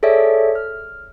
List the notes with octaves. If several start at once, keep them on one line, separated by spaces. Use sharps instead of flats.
G#4 A4 C#5 D5 E5
F6